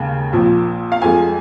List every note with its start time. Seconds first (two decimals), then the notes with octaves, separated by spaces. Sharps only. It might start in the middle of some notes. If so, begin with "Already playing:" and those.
Already playing: D#2 C#3 G#3
0.32 A#1 A#2 F3
0.92 F5
1.02 F2 F3 G#3 G#5